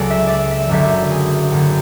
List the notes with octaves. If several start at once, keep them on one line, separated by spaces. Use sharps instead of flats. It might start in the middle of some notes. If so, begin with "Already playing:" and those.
Already playing: C#2 C#3 F#3 F#4 A4 D5
E5
D5 E5
E5
F#1 F#2 D3 F#3 E5
G#4
F#1 F#2 D3 F#3